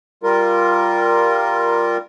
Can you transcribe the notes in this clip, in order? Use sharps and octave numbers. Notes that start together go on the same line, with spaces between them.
G3 F4 A#4